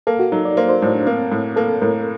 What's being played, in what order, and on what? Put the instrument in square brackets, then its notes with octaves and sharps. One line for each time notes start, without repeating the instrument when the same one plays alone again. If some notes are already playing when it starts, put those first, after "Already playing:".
[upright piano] A#3 [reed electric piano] A4
[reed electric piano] F#4
[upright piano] F#3 [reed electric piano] D#4
[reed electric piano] D5
[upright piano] A#3 [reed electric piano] C5
[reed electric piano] C5
[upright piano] A2
[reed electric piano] D4
[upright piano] A#3 [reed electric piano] C4
[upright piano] A2
[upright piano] A#3 [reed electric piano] A4
[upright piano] A2 [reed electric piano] A#4